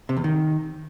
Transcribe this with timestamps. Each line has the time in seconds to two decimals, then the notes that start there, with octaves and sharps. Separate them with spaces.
0.09 C3
0.17 E2
0.24 D#3